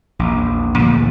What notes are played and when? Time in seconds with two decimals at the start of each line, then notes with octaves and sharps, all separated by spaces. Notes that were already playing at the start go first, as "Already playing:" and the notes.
0.19 A#1 E2
0.79 D2 A#2 E3 A3